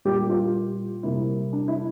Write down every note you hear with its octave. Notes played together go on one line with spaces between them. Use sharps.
A#2 G3 A#3 G4
F4
C3 G3 A#3 E4
D4
E4